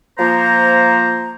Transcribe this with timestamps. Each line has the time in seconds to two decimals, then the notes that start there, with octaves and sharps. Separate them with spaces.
0.19 F3 A#3 C5 A#5